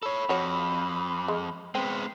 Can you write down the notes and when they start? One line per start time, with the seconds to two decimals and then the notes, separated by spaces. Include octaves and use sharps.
0.03 A4 C#5 B5
0.29 F2 F#4 C#5
1.28 G#3
1.75 G#3 B3 C4